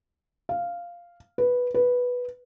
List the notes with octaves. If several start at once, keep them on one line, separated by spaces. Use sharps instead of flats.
F5
B4
B4